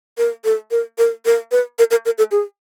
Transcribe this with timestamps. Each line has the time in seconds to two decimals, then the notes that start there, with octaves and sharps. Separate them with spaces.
0.18 A#4
0.45 A4
0.71 A#4
0.98 A#4
1.25 A#4
1.51 B4
1.79 A#4
1.91 A#4
2.05 A#4
2.18 A4
2.31 G#4